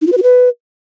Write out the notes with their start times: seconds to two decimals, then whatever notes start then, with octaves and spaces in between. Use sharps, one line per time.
0.02 D#4
0.07 F4
0.12 B4
0.17 F#4
0.23 B4